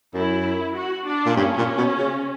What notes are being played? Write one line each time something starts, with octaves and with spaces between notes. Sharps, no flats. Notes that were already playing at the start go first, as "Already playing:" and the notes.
F#2 E4
F#4
D4
A#2
G2 C#4
A#2
B2
C#3